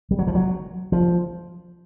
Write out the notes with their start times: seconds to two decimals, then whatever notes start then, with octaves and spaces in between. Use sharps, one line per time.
0.11 G3
0.19 F#3
0.27 F3
0.35 F#3
0.92 F3